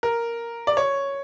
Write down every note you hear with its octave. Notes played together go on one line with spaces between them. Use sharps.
A#4
D5
C#5